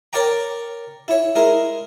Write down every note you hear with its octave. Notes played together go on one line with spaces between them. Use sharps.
A#4 C#5 D5 G5 A#5
E4 C#5
G#3 E4 A#4